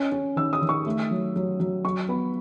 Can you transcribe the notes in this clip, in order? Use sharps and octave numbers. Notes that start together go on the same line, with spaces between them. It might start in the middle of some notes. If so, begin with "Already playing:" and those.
Already playing: C#4
C#4
D#3 E6
D#6
D#3
C#6
A3
F#3
F#3
F#3
F#3 C#6
B3 B5